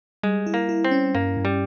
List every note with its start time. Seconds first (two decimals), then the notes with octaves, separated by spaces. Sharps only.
0.23 G3 G#3
0.47 E4
0.54 A#3
0.69 E4
0.84 C4
0.91 C#4
1.15 G2 A#3
1.37 G2
1.45 G3